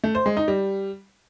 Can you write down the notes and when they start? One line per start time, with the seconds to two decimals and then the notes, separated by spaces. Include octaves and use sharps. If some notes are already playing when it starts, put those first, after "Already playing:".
0.04 A3
0.15 C5
0.26 G#3
0.37 D#4
0.48 G3